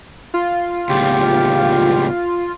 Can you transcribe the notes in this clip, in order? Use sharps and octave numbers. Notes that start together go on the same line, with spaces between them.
F4
C#2 A2 G4